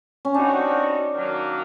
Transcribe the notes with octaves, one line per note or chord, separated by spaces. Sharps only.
C#4
G3 C4 D4 D#4 F#4
D#3 F#3 A#3